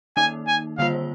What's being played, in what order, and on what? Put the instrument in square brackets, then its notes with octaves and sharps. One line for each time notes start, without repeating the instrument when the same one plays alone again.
[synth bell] D#3 A#3 D#4 [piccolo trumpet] G#5
[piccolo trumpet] G#5
[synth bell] D3 G3 A#3 F4 C5 [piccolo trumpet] F5